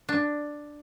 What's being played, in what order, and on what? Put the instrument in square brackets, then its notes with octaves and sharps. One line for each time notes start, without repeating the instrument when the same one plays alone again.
[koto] D4